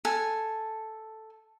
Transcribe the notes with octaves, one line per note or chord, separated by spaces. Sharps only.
A4 G#5